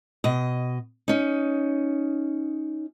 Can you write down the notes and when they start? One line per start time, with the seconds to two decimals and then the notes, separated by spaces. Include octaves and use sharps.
0.24 B2 D#5
1.08 C#4 D#4